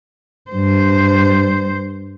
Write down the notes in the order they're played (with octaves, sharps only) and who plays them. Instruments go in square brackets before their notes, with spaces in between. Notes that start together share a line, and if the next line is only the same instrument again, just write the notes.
[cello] G2 C5